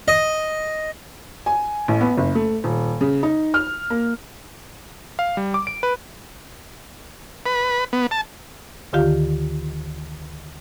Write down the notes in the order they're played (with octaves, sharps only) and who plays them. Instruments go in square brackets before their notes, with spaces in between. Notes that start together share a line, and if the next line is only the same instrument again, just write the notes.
[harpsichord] D#5
[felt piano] G#5
A1
B3
F#1
A3
D#1
C#3
D#4
F6
A#3
[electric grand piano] F5
G3
D6
D7
B4
[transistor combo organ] B4
B3
A5
[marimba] D2 D3 D#3 F4 G4 F5